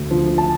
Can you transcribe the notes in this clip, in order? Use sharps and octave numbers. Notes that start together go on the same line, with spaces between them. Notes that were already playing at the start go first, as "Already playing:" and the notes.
Already playing: D2
D3 F3
A5